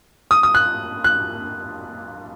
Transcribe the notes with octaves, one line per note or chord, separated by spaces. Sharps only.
D#6
D#6
F#6
F#6